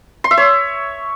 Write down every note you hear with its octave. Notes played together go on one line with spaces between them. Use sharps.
C6
E5
C#5